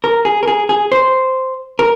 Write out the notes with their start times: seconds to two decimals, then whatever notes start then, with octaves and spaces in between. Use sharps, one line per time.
0.04 A#4
0.25 G#4
0.43 A#4
0.48 G#4
0.69 G#4
0.92 C5
1.79 A#4